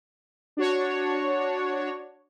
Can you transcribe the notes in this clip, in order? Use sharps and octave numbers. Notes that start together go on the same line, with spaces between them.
D4 F#4 C#5